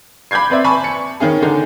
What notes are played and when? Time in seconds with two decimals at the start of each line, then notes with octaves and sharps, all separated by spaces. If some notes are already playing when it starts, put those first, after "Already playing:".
0.31 B5 D6 G6 G#6 C7
0.50 C4 B4 D5 E5
0.64 G#5 A5 B5 C#6
0.84 C#7
1.20 D#3 C#4 G#4
1.42 D3 D#4